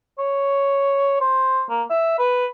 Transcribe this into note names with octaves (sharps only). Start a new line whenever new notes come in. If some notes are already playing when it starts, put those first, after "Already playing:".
C#5
C5
A#3
E5
B4